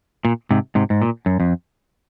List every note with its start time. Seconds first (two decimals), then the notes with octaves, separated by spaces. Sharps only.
0.25 A#2
0.51 G#2 C3
0.75 G#2 C3
0.90 G#2
1.02 A#2
1.26 F#2
1.40 F2